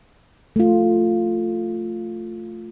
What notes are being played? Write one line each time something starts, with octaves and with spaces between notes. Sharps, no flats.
A3 F4